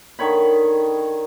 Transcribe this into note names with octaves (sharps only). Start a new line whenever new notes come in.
D3 D#3 C#5 B5